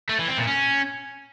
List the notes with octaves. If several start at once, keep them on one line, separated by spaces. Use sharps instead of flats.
A3
E3
C4
A#2
C#4